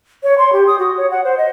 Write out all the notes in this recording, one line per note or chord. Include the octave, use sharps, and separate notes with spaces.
C#5
C6
G4
D#6
F#4
C#5
F#5
C5
D#5